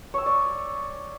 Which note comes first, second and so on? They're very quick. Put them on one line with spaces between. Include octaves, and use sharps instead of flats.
C#5 E6 G#5 D5